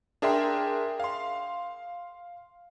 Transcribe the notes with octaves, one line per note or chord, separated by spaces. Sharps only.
D4 G#4 A#4 E5 G5 C6
F5 C6